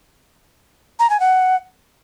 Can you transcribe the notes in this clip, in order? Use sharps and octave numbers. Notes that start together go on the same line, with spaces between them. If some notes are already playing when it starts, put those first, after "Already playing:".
A#5
G#5
F#5